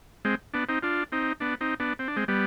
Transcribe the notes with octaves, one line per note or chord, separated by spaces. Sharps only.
G#3 C4
B3 D4
C4 D#4
D4 F4
C4 D#4
B3 D4
C4 D#4
B3 D4
C4
D4
G#3 C4
G3 B3